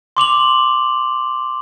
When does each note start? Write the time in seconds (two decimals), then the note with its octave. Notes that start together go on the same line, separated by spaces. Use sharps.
0.17 C6 D6 F7 F#7